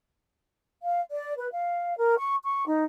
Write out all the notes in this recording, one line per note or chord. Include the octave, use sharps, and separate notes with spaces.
F5
D5
B4
F5
A#4
C#6
C#6
D#4